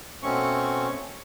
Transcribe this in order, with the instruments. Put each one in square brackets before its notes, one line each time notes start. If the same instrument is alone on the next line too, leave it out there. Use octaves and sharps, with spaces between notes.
[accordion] B2 A3 C4 C#4 C#6